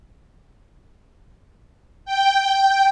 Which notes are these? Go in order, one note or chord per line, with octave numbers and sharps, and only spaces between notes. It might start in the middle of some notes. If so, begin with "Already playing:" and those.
G5